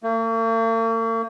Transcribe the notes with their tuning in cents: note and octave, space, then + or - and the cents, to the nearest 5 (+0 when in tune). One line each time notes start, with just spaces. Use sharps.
A#3 -45